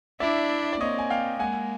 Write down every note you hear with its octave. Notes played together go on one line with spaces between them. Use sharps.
D4 E4 D5 E5
D5
A#3 C4 C#5 D#5
G#5
F5 G5
G#3 A#3 F#5 G#5